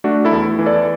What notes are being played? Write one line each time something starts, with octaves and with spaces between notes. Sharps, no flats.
A3 D4 F#4
E4 A4
E2
E3
A4 D5